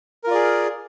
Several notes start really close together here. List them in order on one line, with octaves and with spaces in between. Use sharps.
A#4 F4 D5 G#4